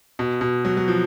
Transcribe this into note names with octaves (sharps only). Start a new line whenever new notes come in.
B2
B2
F#3
F#3
F3